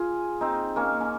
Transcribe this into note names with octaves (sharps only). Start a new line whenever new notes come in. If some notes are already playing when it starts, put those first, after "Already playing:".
Already playing: F4 G#4
C4 D#4
A#3 C#4
C#4